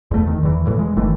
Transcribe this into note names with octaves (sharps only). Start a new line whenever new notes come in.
E2 A3
D#3
E2 E3
E2 A2 E3
G#3
F#1 D#3 E3 A3